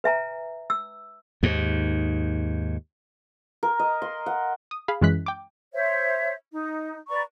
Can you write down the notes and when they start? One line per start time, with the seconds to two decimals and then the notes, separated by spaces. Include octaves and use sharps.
0.04 B4 E5 G#5 A#5
0.70 E6
1.43 D#2 G#2
3.63 A#4
3.79 D#5
4.02 C6
4.26 F#5
4.71 D#6
4.88 G#4 F5 B5
5.01 F#2 E3 G#3 C#4 F#6 B6
5.26 G5 D6
5.73 C5 C#5 E5
6.52 D#4
7.09 B4 D5 A#5 C#6